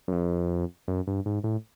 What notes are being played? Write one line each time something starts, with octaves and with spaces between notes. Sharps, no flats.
F#2
F2
F#2
G2
G#2
A2